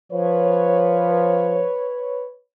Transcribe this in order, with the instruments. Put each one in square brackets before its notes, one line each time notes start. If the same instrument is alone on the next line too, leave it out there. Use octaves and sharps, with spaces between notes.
[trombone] F3 [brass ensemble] B4 C#5